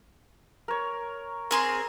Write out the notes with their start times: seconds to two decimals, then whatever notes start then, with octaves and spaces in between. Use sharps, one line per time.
0.68 A#4 C#5
1.51 C4 G#4 A#4 C6